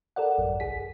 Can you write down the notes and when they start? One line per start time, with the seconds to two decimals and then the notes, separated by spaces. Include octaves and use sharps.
0.16 A4 A#4 D5 F#5
0.38 A1 F#2
0.60 C2 G#4 B6